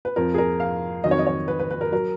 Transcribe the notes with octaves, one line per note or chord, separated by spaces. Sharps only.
B4
F2 F3 A#4
G#4
A#4
F5
F2 D#3 F#3 D#5
C#5
D#5
C#5
B4
B4
B4
A#4
F#3 A#4